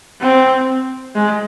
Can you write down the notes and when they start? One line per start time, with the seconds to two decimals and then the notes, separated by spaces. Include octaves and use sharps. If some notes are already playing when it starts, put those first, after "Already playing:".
0.20 C4
1.15 G#3